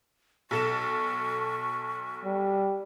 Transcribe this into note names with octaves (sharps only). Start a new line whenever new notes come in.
B1 A4 C#6 E7
G3